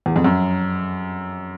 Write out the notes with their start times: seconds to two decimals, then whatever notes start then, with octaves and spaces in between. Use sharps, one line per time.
0.06 E2
0.16 F2
0.24 F#2